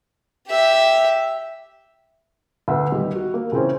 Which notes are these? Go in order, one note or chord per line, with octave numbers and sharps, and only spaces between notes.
G4 E5
D2 B3 E6
D#3 G3
F#4
A#3
C#3 E3 C4 C#4